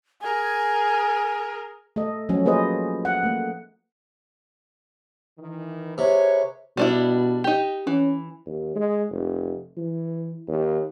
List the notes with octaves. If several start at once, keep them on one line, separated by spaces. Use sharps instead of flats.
G#4 A#4 G#5
A3 A4 D#5
F3 F#3 A3 C#4
A#3 G#4 B4 C5 D#5
F#5
A3 A#3
D#3 E3
C3 G#4 B4 C#5
B2 G3 D4 E4
D#4 G4
E3 C#4
D#2
G#3
F1
E3
D#2